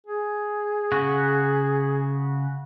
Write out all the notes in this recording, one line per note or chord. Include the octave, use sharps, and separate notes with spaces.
G#4
C#3 F#4